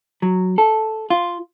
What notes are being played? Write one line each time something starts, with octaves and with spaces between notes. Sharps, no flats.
F#3
A4
F4